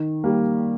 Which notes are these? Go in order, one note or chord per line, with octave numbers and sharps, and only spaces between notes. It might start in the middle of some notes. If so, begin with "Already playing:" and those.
Already playing: D#3
G3 A#3